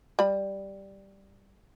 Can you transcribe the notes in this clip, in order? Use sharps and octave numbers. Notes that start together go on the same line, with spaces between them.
G3 B5